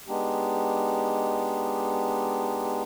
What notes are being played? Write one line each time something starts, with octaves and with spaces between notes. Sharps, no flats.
G#3 B3 D4 D#4 G4